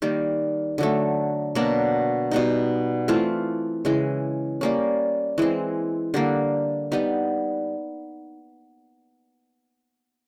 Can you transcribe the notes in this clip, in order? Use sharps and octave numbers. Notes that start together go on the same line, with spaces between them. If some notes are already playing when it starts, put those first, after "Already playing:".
D#3 G3 A#3
D3 F#3 A3
B2 F#3 A#3 D4
B2 G3 B3 D#4
E3 A3 C4 F4
C#3 E3 G#3
G3 A#3 C#4
E3 G#3 C4
D3 G3 A#3
G3 B3 D#4